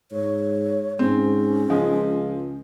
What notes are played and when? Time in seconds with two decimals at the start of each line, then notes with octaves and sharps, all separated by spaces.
0.11 G#2 C#5
0.99 G#2 C4 C#4
1.70 C#2 F3 G#3